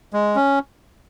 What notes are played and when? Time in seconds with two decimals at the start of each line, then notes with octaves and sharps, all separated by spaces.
0.13 G#3
0.36 C#4